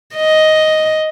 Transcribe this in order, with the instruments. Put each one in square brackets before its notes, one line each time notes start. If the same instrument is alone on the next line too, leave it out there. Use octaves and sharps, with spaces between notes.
[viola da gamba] D#5